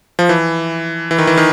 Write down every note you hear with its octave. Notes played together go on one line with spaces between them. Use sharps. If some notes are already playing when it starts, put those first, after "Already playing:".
F3
E3
E3
D#3
E3
D#3